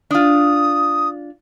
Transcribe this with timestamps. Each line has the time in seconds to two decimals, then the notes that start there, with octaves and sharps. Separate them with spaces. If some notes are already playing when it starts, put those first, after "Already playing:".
0.11 D4 F4 D#6